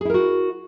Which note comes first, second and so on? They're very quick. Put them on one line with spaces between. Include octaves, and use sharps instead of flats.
G#4 E4 A#4 F#4